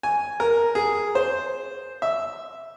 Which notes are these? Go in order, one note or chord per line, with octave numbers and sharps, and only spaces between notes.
G#5
A#4
G#4
C5
E5